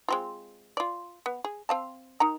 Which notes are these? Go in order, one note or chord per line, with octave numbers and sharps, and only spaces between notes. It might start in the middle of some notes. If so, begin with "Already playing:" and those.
G#3 C4 F4
F4 D5
B3
G#4
C4 F5 A5
D#3 D#4 A#5